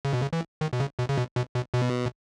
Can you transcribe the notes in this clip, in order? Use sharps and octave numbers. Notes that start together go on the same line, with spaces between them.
C#3
B2
C#3
E3
D#3
B2
C#3
B2
C#3
B2
B2
B2
B2